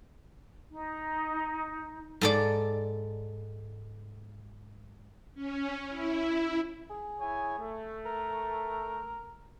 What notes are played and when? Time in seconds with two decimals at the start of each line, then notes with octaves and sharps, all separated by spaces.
0.72 D#4
2.21 G#2 A4 D5
5.35 C#4
5.89 E4
6.90 G#4
7.20 E4 C#5 G#5
7.57 A3
8.06 A#4